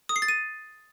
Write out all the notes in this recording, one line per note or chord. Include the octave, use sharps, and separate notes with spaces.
D#6
C7
A6
D#7